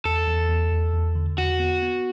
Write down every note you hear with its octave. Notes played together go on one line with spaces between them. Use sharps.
E2 A4
E2
E2
E2
E2
D3
E2 F#4
B3
B3